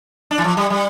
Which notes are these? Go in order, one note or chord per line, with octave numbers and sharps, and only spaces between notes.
D4
E3
F3
G3
G3